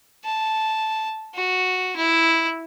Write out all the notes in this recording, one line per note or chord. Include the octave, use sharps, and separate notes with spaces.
A5
F#4
E4